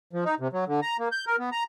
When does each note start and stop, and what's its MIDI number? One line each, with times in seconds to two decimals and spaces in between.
0.13 0.24 53
0.25 0.35 63
0.40 0.48 48
0.53 0.64 54
0.67 0.80 50
0.82 0.97 82
0.99 1.09 58
1.12 1.25 91
1.27 1.36 70
1.39 1.50 59
1.52 1.63 82